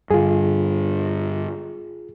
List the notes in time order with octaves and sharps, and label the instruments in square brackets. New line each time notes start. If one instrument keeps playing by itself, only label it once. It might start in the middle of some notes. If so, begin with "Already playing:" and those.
[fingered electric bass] G2 D3 [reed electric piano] F4 G#4